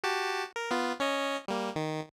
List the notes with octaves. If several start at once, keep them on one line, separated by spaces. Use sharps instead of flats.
F#4 G4 A5
A#4
B3 F4
C#4 C#5 D#5
G3 A#3
D#3